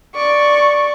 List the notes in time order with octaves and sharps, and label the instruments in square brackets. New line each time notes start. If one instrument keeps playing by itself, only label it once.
[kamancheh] D5 C#6